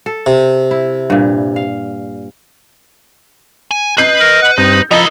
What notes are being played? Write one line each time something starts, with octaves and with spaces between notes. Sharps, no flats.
A4
C3
E4
G2 A#2
F5
G#5
B4 D#5 G6 C7
A#4
F#5
G2 C4 D#4 D#6 G6
F3 E4 A4 A#4 D#5 A#5 B5